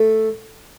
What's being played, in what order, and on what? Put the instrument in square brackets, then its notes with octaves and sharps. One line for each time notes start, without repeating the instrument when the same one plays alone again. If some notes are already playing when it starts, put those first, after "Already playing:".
Already playing: [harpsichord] A3